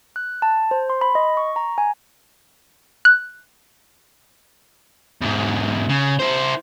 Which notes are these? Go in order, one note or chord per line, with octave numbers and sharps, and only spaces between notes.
F#6
A5
C5
C6
B5
D#5
C#6
A#5
G#5
F#6
E2 G#2
C#3
E4 C5